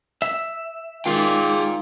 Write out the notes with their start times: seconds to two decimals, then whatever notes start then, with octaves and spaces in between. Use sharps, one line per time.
0.22 E5
1.06 A#2 D#3 G#3 D#4 F4 G#4 F5 G5